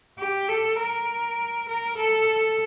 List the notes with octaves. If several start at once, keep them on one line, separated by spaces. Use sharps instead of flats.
G4
A4
A#4
A#4
A4